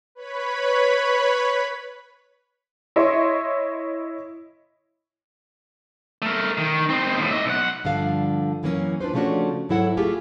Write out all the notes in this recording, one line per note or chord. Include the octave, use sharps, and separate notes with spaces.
B4 C#5 B5
E4 C#5 D#5 E5 C6 C#6
A3 A#4
D#3
C4 D#4
D#2 A2
D#5 E5
B1 F#5
G2 D3 F3 A4 F5
F#2 E3 F#3 A#3 B3 C#4
D4 F4 B4 C5
C#3 F3 A3 C#4 D4 F#4
G#2 F#3 E4 A4 F#5
A3 F4 G4 G#4